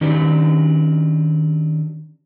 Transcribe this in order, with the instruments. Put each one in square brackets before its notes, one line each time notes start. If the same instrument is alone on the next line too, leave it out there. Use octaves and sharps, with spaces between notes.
[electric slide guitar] D#3 F#3 C#4 D4 G4 B4